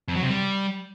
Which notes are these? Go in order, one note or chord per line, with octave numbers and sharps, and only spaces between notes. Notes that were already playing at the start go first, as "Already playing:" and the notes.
F2
F#3
C3
G3